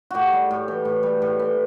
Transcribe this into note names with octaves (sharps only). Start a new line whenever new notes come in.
A2 F#4 G4
G3
A2
E3
A2
G3
A2
E3